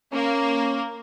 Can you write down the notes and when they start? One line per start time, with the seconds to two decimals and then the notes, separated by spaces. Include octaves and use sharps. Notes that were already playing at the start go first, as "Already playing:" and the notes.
0.13 A#3 C#4